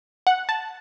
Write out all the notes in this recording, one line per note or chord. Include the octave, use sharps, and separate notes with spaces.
F#5
A5